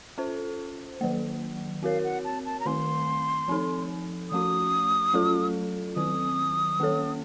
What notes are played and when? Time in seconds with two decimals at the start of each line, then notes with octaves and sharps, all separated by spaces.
0.18 C#4 F4 A4 C5
1.01 D#3 F#3 A#3
1.83 C4 F#4 A#4 C#5 F5
2.04 F#5
2.24 A5
2.45 A5
2.60 A#5
2.66 D#3 A3 C4 C6
3.48 F3 C4 D#4 A4
4.31 F3 A3 C#4 F#4 D#6
5.14 F#3 A3 C#4 F4 A4
5.96 D#3 F#3 C4 D#6
6.79 D#3 A#3 C#4 A4 C#5